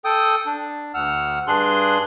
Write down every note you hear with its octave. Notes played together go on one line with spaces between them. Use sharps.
A4 G5 D#6
D4
D2 F#5 E6 F6
G2 D4 G#4 C6 F#6